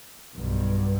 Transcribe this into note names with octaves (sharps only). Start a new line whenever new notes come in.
B1 G2